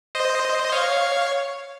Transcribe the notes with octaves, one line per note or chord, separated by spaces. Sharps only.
C5 D#5
C#5 F5